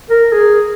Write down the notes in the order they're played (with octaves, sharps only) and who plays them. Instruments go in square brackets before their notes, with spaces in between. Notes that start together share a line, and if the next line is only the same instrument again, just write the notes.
[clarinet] A#4
G#4